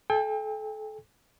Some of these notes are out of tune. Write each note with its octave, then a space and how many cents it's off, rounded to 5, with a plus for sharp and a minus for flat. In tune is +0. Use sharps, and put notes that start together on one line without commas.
A4 -30 G5 +35